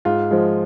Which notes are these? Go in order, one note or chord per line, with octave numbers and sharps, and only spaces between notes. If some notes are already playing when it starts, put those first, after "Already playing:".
G#2 F4
F3 G#3